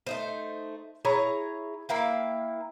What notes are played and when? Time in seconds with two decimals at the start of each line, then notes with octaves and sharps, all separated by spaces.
0.07 A3 D#4 C5
1.05 E4 G#4 C#5 A#5
1.89 A#3 E4 F5 G5